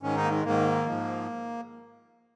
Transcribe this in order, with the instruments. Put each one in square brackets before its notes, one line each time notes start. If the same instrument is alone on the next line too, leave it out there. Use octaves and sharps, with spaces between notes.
[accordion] G#2 D#3 C#4
D#4
A#3
G#3
G#2 D#3 A#3
G#2 F3